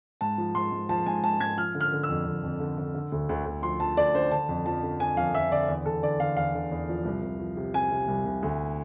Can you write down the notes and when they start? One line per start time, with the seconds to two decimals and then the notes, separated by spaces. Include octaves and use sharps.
0.21 G#2 A5
0.38 F3
0.55 G#2 C6
0.72 G#2
0.89 F3 A5
1.06 G#2 G#5
1.23 G#2 A5
1.40 G#2 G#6
1.57 F3 F6
1.75 D3
1.80 F6
1.92 D3
2.03 E6
2.09 F2
2.26 F2
2.43 F2
2.60 D3
2.78 D3
2.94 D3
3.12 D2
3.29 D2
3.46 D2
3.63 F3 C6
3.80 F3 A5
3.97 D2 D5
4.14 D3 C5
4.31 D3 A5
4.49 F2
4.66 F3 A5
4.83 D3
5.00 D3 G#5
5.17 F2 F5
5.34 F2 E5
5.51 D3 D5
5.68 E2
5.86 E2 A4
6.03 D3 D5
6.20 D3 F5
6.36 E2 F5
6.55 D3
6.71 E2
6.89 F3
7.05 C2
7.22 C2
7.39 F3
7.57 C3
7.74 C3 G#5
7.91 C3
8.08 C2
8.25 C2
8.43 D2